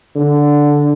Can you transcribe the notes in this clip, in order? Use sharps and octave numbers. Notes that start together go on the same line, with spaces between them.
D3